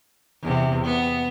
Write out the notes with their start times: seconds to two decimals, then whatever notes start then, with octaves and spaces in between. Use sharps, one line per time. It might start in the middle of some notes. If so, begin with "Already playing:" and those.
0.43 E2 C3
0.85 B3